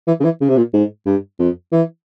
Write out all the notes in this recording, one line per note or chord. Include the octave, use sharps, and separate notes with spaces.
E3
C#3
E3
C#3
C3
A#2
G#2
G2
F2
E3